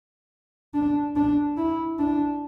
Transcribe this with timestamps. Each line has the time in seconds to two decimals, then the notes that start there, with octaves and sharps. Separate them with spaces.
0.74 D4
1.16 D4
1.57 E4
1.99 D4